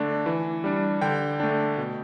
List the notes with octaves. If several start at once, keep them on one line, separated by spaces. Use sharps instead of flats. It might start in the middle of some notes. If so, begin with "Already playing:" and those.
Already playing: D3 A3 D4
E3
G3 D4
D3 G5
A3 D4
B2